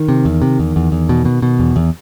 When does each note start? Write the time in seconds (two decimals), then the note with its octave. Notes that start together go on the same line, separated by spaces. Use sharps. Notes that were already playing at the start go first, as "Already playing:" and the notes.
Already playing: D#3
0.09 C3
0.25 E2
0.42 C3
0.59 E2
0.76 E2
0.92 E2
1.09 B2
1.25 B2
1.42 B2
1.59 E2
1.76 E2